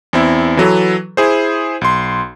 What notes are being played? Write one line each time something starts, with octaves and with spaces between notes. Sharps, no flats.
E2 C4 E4
E3 F#3 A4 B4
E4 G#4 C5
B1 C6